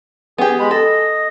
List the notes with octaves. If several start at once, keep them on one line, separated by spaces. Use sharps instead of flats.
B3 G4 G#4
G#3 B5
A4 D#5